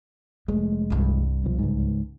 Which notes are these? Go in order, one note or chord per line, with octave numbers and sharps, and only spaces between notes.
F1 G#3 A3
C2 G2
B1 E3 F3
C#2 G#2